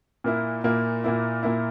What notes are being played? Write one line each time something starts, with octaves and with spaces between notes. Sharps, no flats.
A#2 A#3 E4
A#2 A#3 E4
A#2 A#3 E4
A#2 A#3 E4